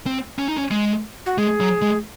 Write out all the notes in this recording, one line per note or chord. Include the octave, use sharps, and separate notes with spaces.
C4
C#4
D#4
C#4
G#3
F#4
G#3 G#4
F#3
G#3